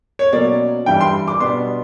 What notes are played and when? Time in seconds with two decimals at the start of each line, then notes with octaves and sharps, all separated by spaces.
0.19 C#5
0.32 B2 F#3 A#3 C#4 D5
0.86 G2 E3 G3 G5
1.01 C6
1.28 D6
1.40 B2 G3 B3 D4 C6